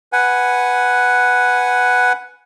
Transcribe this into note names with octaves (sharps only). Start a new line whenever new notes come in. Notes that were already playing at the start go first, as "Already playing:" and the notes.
B4 F#5 G#5